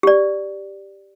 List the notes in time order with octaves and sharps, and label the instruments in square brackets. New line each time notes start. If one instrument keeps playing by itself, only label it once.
[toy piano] G4 D5